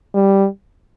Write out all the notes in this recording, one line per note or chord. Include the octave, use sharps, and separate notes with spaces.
G3